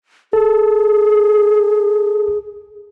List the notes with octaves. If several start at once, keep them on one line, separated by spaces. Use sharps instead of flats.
G#4 A4